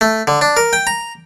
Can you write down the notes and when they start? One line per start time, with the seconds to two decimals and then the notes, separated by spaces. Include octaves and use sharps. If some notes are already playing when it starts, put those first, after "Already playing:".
0.01 A3
0.27 D3
0.41 D4
0.57 A#4
0.73 G5
0.87 A#5